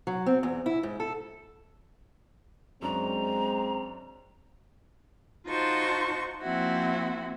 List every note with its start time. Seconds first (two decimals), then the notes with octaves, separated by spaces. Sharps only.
0.07 F#3
0.26 C4
0.43 E2
0.66 E4
0.83 G#2
1.00 A4
2.82 F#2 G#3 C4 D4 A#5 C#6
5.48 D#4 F4 F#4 C5 A5 C#6
6.42 F3 A#3 C4 E4 F#4